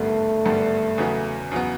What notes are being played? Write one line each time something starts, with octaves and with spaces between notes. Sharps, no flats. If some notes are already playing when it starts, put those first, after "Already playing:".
Already playing: G#1 G2 D3 G3 A3 B3
G#1 G2 D3 G3 B3
E2 C#3 F#3 B3
E2 C#3 F#3 B3